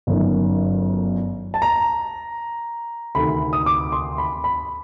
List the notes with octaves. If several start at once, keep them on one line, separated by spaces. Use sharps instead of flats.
G1 F#2 D#3
A5
A#5
D2 C3 D#3 B5
D#6
D6
C6
B5
B5